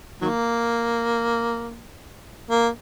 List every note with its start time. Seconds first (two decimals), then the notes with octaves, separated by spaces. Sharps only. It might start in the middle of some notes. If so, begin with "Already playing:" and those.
0.21 D#3 F#3 A#3
2.50 A#3